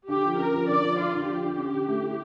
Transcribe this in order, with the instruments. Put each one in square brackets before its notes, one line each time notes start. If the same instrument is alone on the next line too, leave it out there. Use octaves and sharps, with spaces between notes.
[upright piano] D3 [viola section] G4
[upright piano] F3
[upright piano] C#4 [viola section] A#4
[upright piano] F3
[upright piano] D3 [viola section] D5
[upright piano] F3
[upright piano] D3 [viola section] F4
[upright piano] D3
[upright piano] F3 [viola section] G4
[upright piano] D3
C#4
D3
A3
E4